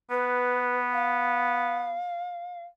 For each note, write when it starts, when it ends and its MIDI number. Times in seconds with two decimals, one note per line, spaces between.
0.10 1.96 59
0.10 0.76 71
0.93 2.63 77